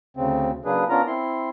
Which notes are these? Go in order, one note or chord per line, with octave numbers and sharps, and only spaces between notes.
D2 C#3 C4
C#3 F#3 A#3 D4 G#4 B4
B3 C#4 D4 F4 A#4 A#5
C4 E4 C6